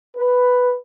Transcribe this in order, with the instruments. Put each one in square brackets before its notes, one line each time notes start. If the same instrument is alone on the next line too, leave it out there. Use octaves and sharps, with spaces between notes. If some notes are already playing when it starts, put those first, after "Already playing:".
[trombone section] B4